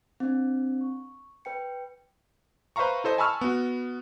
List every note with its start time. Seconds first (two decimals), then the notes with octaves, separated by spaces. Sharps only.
0.20 C4 D4
0.81 C#6
1.45 B4 G5 C#7
2.76 B4 C5 E5 F5 A#5 C#6
3.04 E4 A4 C5 D#5
3.18 G#5 A5 B5 C#6 E6 F6
3.41 B3 F#4